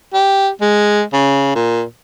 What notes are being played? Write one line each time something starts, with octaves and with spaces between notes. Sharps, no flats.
G4
G#3
C#3
A#2